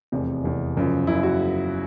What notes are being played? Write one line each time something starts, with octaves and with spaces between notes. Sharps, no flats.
F1 E2 C3
F1 E2 C3
F#1 F#2 C#3 F3
F#1 F#2 C#3 F3 E4
F#4